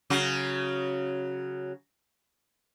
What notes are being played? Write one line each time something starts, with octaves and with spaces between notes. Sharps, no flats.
C#3 F#3